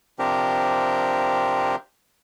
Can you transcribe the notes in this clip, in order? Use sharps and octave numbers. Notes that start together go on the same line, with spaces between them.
C3 F3 C4 D4 G4 A#4